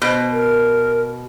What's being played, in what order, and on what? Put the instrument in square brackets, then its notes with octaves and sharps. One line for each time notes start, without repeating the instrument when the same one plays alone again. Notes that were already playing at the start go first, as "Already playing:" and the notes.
[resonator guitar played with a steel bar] B2 [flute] C5
[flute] A#4